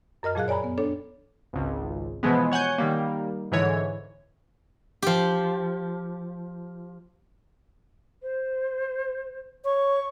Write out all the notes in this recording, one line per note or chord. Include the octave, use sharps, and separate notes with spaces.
F#2 A#4 D#5 F6
F2 A#2 F#3 G#4 F5 F#6
C#5 D5 G#5 A#5 B5
B3
D4 A4 C#5
G#1 C#2
B2 E3 F3 G#3 B3
C#5 F#5 G#5 G6
D#3 G3 A#3
G#2 D3 E3 C#5
F3 G4
C5
C#5 C#6